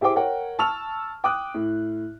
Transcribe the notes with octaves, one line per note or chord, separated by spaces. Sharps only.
E4 G4 G#4 C5 G5 D6
A#4 C#5 F#5 G5
A5 C#6 E6 F6 F7
G5 D6 D#6 F#6
A2